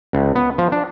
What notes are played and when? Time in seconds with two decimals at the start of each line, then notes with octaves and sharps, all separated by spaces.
0.13 C#2
0.35 B3
0.58 F3
0.72 D4